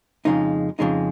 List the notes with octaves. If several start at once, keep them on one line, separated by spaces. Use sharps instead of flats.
F2 C#3 G#3 D#4
F2 C#3 G#3 D#4